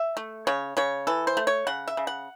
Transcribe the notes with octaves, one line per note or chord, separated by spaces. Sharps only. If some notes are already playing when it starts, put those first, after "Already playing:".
Already playing: E5
A3
C#3 C#5
C#3 C#5
E3 A4
C5
A3
C#5
C#3 F#5
E5
C#3
F#5